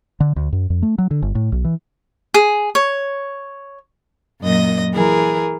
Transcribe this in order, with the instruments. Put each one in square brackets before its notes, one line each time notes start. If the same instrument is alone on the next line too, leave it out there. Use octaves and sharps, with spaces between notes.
[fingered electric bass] D3
D2
F#2
F2
A3
F#3
D3
G1
A2
B1
E3
[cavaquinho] G#4
C#5
[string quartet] F#2 A#2 D#5 A#6
E3 G#4 A#4